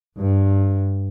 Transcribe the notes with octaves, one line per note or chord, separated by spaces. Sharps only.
G2